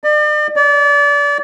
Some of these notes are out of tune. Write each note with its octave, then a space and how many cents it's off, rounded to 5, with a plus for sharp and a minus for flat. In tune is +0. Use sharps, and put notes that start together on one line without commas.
D5 +40
D5 -30